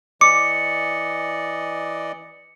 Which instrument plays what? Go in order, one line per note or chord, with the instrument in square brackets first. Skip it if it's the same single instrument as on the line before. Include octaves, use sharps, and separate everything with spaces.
[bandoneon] E3 D5 D#5 [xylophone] D6 [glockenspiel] C#7